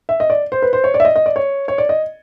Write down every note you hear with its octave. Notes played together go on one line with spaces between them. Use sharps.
E5
D#5
D5
C5
B4
C5
C#5
D5
E5
D#5
D#5
D5
C#5
C#5
D5
D#5